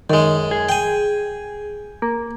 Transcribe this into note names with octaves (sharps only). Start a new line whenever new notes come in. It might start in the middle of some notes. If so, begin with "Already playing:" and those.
F#2 D#3 G#3
G#4
G5 G#5
A#3